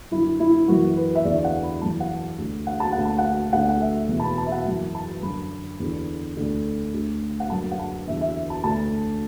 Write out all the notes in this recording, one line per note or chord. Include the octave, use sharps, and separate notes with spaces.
F#2 D3 E4
E4
F#2 E3 F#4
B4
E5
E2 D3 D5
F#5
B5
F#2 E3 A5
F#5
D2 D3
F#5
A5
D2 D3 F#5
A5
F#5
D2 D3 F#5
F#5
E5
E2 B2
A5
B5
A5
E5
F#5
F#2 E3
A5
F#2 D3 B5
E2 D3
D2 D3
D2 D3
F#5
F#2 D3 A5
F#5
A5
E2 D3 E5
E5
A5
D2 D3 A5